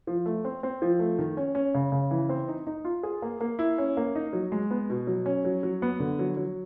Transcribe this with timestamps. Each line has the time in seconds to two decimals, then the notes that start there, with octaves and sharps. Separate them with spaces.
0.07 F3
0.26 A3
0.45 C4
0.63 C4
0.82 F3
0.99 A3
1.19 D#3
1.37 C#4
1.55 C#4
1.74 C#3
1.92 C#3
2.11 E3
2.29 C4
2.48 D#4
2.67 D#4
2.85 F4
3.03 G#4
3.22 A#3
3.41 A#3
3.59 E4
3.78 C#4
3.97 A#3
4.16 D#4
4.33 F#3
4.52 G#3
4.71 B3
4.90 B2
5.07 F#3
5.26 C#4
5.45 F#3
5.63 F#3
5.82 B3
6.00 D3
6.19 F#3
6.37 F#3